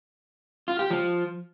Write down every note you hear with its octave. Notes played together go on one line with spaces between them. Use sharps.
F4
G4
F3